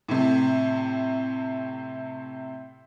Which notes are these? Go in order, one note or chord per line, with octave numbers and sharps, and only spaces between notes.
A2 C3